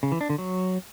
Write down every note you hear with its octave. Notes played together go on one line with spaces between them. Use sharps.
C#3
E3
D4
D3
F#3